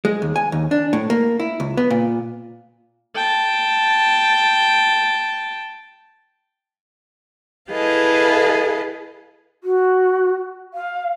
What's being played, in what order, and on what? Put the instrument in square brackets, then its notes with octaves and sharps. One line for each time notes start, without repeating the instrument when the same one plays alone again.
[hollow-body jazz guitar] G#3
D#2
G#5
D#2
D4
A2
A#3
E4
C#2
B3
A#2
[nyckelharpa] G5 A5
[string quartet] E4 G#4 A4 B4 D#5 F5
[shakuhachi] F#4
F5